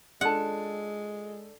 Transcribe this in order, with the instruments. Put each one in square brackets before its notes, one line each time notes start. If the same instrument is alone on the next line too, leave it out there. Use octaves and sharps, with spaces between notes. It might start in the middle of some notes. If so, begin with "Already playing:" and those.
[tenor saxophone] G#3 [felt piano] D4 A4 [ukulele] F4 A5 [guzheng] F#5